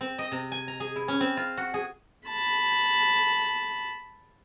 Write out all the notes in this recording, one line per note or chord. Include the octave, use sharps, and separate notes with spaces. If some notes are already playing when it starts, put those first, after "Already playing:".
C4
D#5
C3
G#5
A#5
G#4
E4
C#4
C4
F4
F#4
G#4
A5 B5